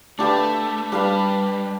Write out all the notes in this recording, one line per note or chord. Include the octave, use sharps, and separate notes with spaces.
A3 D4 G4 B4 F5
G3 D4 G4 B4 F5